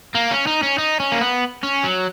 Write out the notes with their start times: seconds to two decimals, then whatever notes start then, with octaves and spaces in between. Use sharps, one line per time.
0.15 A#3
0.31 C#4
0.47 D#4
0.63 C#4
0.78 D#4
1.00 C#4
1.12 A#3
1.21 B3
1.63 C#4
1.84 F#3